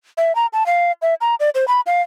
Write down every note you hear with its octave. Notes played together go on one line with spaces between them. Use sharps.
E5
A#5
A5
F5
E5
A#5
D5
C5
B5
F5